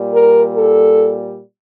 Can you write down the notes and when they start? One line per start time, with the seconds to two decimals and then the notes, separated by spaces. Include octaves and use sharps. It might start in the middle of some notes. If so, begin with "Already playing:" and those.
Already playing: A#2 G3
0.12 A#4
0.55 A4